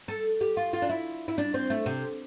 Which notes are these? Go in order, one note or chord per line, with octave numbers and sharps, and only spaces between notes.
A4
G4
F4
F4
D4
E4
E4
D4
C4
A3
C3